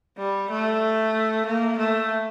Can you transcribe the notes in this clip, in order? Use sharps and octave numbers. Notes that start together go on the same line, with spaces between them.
G3
A3
A#3
A3